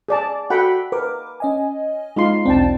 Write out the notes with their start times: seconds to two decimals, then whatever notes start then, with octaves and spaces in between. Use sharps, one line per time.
0.08 G#4 D5 A5
0.50 F#4 A4 E5 F#5 G5 B5
0.92 A#4 B4 D6
1.40 C#4 D#5 G#5
2.16 G#3 D#4 F4 C6
2.45 B1 E2 C4 D4 G5 A5